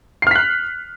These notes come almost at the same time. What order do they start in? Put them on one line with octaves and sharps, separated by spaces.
C7 F6 B6 F#6